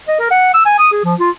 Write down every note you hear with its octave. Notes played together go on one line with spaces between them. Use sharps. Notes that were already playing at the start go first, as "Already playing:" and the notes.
D#5
A#4
F#5
E6
G#5
D#6
G#4
F3
F4